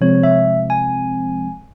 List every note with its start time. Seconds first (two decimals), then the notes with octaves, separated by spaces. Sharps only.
0.01 C3 F3 G#3 C4 C#5
0.23 E5
0.70 G#5